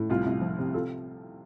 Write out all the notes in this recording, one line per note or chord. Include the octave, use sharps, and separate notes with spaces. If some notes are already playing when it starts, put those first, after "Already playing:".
Already playing: A2
C2 F4
C2
F3
C3
F4 A4